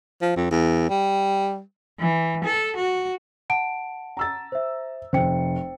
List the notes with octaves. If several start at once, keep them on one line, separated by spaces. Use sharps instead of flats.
F3
F2
E2
G3
E3
A4
F#4
F#5 A5 D7
A#5 E6 A6
C5 E5
F1 C5 G5 C#7